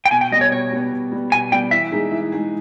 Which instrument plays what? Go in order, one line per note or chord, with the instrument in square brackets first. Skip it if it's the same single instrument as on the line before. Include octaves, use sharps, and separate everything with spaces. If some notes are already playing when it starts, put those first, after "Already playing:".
[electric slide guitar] G5
[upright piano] B2 [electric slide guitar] G#5
[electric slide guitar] G5
[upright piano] G3 [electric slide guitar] D#5
[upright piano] B3 [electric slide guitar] C#5
[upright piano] B2 [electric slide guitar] C#5
[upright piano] G3 B3
B2
G3 B3
[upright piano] B2 [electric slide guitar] G#5
[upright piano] G3 B3 [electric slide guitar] G5
[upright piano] E3 [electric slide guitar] E5
[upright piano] G#3 D#4 G#4
E3
G#3 D#4 G#4